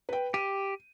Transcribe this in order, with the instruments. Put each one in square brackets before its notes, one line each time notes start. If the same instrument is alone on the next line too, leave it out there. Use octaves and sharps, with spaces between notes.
[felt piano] B4 G5
[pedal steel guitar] G4 [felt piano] D#7